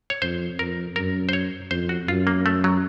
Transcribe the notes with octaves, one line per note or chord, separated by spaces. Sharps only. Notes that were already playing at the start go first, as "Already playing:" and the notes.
C#5
F2 C5
F2 A#4
F#2 A#4
C5
C#5
F2 C5
F#4
F#2 F4
A#3
A3
F#3